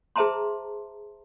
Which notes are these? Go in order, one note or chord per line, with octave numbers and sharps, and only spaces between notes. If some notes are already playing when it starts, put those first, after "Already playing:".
G#4 C5 E5 A5 A#5 C6